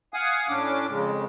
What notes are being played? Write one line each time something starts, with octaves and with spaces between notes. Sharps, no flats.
F5 F#5 G#5 D#6
A2 C#4 D4 D6
F2 C#3 G#3